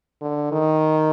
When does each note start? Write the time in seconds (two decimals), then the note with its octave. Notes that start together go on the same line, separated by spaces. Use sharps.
0.21 D3
0.52 D#3